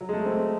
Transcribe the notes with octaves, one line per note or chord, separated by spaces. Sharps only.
F#3
G#3
A3
C4